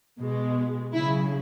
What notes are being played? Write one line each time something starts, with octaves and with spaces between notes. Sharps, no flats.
B2 G#3
C#3 F#3 E4